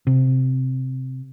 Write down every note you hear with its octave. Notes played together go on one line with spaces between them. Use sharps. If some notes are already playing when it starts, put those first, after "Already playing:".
C3